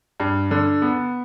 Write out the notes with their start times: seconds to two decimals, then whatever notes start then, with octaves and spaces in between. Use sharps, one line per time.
0.20 G2
0.51 D3
0.82 B3